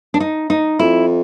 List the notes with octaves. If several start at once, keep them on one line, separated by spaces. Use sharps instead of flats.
D4
D#4
D#4
F2 E4